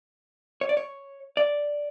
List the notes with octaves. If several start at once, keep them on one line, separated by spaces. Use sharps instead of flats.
C#5
D5
C#5
D5